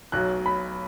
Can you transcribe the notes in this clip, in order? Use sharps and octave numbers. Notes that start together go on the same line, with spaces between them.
B1 B2 F#3 F#6
B5